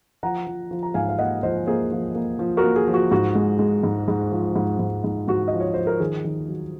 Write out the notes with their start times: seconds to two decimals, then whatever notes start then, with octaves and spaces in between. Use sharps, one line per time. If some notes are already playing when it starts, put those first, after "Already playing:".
0.23 F3 F#5 A#5
0.47 F3
0.71 F3
0.83 A#5
0.94 G#2 F5 G#5
1.09 F5
1.18 A#3 D#5 F#5
1.43 F3 C5 D#5
1.67 A#3 G#4 C5
1.92 F3
2.15 A#3
2.39 F3
2.57 F#4 A#4
2.64 A#3
2.76 G#4
2.87 F3
2.94 F#4
3.11 G#2 F#4
3.35 G#3
3.59 G#3
3.83 G#2
4.08 G#2
4.32 F3
4.56 G#2
4.79 G#2
5.04 G#2
5.28 G#2 F#4
5.48 F3 D#5
5.60 C#5
5.74 F3 C5
5.87 A#4
6.00 D#3 G#4
6.25 D#3
6.49 F#3